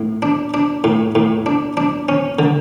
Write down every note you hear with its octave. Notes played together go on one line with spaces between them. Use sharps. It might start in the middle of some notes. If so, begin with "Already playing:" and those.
Already playing: A2
D4
D4
A2
A2
D4
D4
C#4
D3